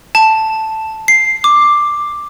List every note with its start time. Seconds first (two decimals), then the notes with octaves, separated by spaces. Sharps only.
0.15 A5
1.08 C7
1.44 D6